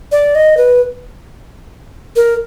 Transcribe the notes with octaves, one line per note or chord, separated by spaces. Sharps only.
D5
D#5
B4
A#4